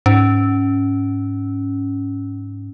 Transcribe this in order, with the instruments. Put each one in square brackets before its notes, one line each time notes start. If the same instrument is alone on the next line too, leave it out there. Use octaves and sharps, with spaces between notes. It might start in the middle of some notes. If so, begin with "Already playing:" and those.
[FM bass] G#2 [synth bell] C#4